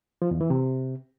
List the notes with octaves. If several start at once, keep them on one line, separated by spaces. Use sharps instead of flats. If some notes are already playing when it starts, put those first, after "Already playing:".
F3
E2
E3
C3